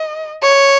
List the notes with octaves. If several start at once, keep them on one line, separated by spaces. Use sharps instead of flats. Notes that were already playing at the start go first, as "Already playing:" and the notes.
Already playing: D#5
C#5